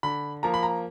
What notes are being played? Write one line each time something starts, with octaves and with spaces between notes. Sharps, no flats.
D3 B5
F3 A#3 A#5
B5
A#5